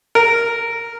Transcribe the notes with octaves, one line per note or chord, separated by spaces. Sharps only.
A#4